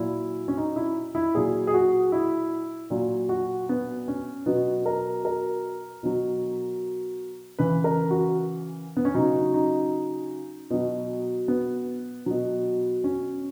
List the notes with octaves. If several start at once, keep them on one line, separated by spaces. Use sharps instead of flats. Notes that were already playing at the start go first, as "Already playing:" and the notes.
Already playing: A#2 F#3 E4
C#4
D#4
E4
E4
A#2 F#3 G#4
G#4
F#4
E4
A#2 F#3
F#4
B3
C#4
B2 F#3 B3
A#4
A#4
B2 F#3
C#3 E3 B4
A#4
F#4
B3
C#4
C#3 F#3 D#4
D#4
B2 F#3
B3
B2 F#3
C#4